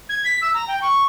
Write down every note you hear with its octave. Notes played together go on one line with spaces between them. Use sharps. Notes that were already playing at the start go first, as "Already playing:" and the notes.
G#6
B6
E6
A#5
G5
C#6